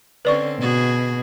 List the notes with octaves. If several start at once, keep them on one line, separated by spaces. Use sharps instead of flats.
D3 C4 C#4 B4 D5 C#6
B2 F#4 G#4